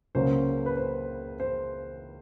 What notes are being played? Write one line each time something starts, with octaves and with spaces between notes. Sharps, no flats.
C#2 C#3 F#3 A#3 C#4 C5
B4
C5
C5